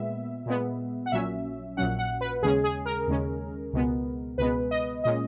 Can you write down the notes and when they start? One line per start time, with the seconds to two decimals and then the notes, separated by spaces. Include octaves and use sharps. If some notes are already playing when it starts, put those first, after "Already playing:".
Already playing: A#2 G#3 B3 E5
0.46 A#2 G#3 B3
1.06 F#5
1.12 A#1 A#2 F#3 C#4 E5
1.77 A#1 A#2 F#3 C#4 F#5
1.99 F#5
2.21 B4
2.42 D#2 C#3 G#3 C#4 G#4
2.64 G#4
2.86 A#4
3.08 D#2 C#3 G#3 C#4
3.73 C#2 B2 G#3 B3
4.38 C#2 B2 G#3 B3 B4
4.71 D#5
5.04 A#2 G#3 C#4 D#5